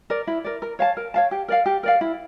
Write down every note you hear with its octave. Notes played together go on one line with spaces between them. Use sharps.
A#4 D5
E4
A#4 D5
A#4
C#5 F5 A5
A#4
C#5 F5 A5
G4
A#4 D5 F5
G4
A#4 D5 F5
E4